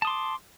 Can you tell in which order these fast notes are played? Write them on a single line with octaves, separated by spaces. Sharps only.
A5 D#6 C6 D6